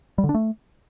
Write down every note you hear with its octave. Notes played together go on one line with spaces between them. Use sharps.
G3
D3
D4
A3